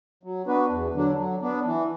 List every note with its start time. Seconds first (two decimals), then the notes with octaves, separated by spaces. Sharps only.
0.23 F#3
0.47 B3 D4 F#4 B4
0.70 E2
0.94 D3 F#3 D4
1.17 F#3
1.41 B3 D4
1.64 E3